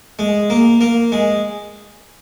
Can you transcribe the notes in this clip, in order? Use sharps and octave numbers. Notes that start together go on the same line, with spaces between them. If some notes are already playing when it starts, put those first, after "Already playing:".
G#3
A#3
A#3
G#3